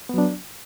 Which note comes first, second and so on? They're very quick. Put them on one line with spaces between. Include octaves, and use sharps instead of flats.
B3 F#3 D4